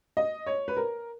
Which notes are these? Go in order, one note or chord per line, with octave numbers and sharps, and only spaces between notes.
D#5
C#5
B4
A#4